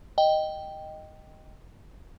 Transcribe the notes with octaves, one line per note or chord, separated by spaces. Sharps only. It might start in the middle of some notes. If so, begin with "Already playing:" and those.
D#5 G5